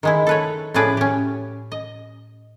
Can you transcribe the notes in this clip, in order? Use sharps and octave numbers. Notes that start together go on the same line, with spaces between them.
D#3 G#3 E4
A4 B4 C#5
A2 F3 C#4 G#4 B4 D5
C#4 G4
D#5